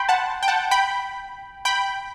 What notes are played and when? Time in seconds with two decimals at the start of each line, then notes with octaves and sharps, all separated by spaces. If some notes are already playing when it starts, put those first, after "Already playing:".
Already playing: G5 B5 C6
0.09 F#5 A5
0.43 G5
0.48 F#5 A5
0.71 G5 B5
1.65 G5 B5